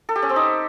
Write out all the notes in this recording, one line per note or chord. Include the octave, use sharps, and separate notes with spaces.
A4
G4
C#4
C4
D#4